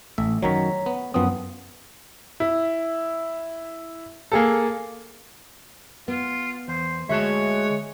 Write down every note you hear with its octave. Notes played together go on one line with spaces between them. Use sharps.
A1 A3 E5
F#2 D#3 F#3 C#5 A#5 B6
B3
F#2 F3 B3 C4 D#6
E4
A#3 G#4 A4
B3 F4
E2 C5
D2 G#3 F#4 C#5 E5 A5